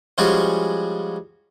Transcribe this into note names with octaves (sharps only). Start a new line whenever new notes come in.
F3 G3 G#3 C#4 F4 F#4